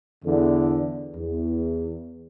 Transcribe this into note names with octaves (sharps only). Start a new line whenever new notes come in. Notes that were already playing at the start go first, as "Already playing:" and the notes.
E2 D3
E2